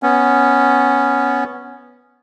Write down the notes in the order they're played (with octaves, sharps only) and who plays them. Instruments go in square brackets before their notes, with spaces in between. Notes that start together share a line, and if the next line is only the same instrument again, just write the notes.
[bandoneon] B3 C#4